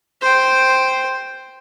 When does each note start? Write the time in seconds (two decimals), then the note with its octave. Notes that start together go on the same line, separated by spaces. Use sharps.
0.21 C5 G5